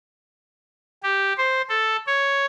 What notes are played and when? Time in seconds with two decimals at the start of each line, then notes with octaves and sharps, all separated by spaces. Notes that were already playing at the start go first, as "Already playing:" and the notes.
1.03 G4
1.37 C5
1.69 A4
2.07 C#5